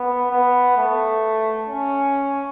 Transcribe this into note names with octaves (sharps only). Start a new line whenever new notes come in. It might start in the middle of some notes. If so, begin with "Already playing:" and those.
Already playing: B3
B3
A3
C#4